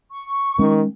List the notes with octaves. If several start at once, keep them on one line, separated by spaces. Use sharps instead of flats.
C#6
D#3 G#3 C#4